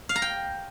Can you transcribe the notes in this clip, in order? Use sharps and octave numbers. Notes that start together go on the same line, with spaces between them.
F5
A#5
G5